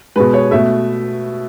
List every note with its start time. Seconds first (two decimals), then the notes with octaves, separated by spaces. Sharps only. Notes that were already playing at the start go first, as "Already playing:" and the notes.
0.16 B2 G#3 B4
0.34 C#5
0.51 B2 A3 E5